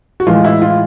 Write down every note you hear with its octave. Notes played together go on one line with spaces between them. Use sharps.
F#4
A2 E3 G#3 F4
E4
F4